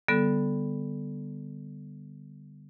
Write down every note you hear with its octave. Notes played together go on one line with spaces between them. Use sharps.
D3 G3 B3 A4